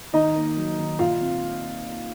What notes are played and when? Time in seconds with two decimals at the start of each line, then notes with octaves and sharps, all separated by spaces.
0.13 D#3 D#4 D#5
0.35 A#3
0.57 F#3
0.79 D#3
0.99 A#2 F4 F5
1.21 C4